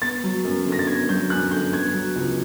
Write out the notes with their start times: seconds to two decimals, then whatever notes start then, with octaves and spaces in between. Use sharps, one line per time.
0.02 B3 A6
0.24 F#3
0.44 F#2
0.66 D3
0.72 A#6
0.79 A6
0.87 B3 G#6
1.09 F#3 G6
1.30 F#2 F#6
1.51 D3 G6
1.73 B3 G#6
1.94 F#3
2.16 C#2